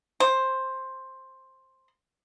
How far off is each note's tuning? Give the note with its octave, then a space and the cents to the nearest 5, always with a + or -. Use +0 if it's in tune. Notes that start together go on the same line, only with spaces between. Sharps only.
C5 +10